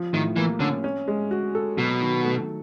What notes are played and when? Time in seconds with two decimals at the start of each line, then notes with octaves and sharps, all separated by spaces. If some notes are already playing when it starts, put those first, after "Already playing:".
Already playing: F3
0.14 A2 D#3
0.36 E3 A#3
0.60 D3 C#4
0.84 C#4
1.08 G#3
1.31 F#4
1.55 A4
1.78 B2 F#3
2.01 D#3
2.25 A3